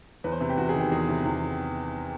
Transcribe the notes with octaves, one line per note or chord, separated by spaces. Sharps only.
E2 B4
C5
C3 B4
G4
E2 F#4
G#4
D#3
G4
E2 G#4
C3
E2